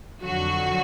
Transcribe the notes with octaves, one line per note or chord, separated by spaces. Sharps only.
F2 D3 F#3 F#4